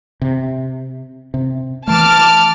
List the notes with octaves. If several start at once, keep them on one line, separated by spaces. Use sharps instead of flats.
C3
C3
E3 A3 A5 D6 F6